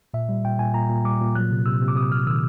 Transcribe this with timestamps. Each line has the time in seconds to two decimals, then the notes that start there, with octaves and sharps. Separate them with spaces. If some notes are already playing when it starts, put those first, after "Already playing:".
0.14 A#2 E5
0.29 G3
0.44 A#2 G5
0.59 A#2 G#5
0.74 A#2 A#5
0.89 A#2
1.04 G3 D6
1.21 A#2
1.35 F#3 F#6
1.51 C3
1.66 C3 E6
1.82 C3
1.88 D6
1.96 C3 D#6
2.12 C3 F6
2.26 D#3 E6